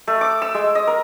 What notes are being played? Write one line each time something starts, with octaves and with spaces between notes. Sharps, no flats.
A3
D6
E6
G#3
D#5
A#4